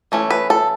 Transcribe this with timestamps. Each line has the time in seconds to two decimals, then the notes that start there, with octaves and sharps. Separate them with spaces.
0.12 E3 A3 C#4
0.30 B4
0.50 A4